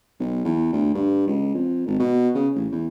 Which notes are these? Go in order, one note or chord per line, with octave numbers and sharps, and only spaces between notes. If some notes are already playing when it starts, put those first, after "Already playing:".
B1
E2
D2
G2
C#2
F2
G#1
B2
C#3
A1
E2